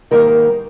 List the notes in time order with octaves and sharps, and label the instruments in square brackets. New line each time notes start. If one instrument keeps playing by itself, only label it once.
[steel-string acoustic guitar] G#2 D#3 G3 A#3 A#4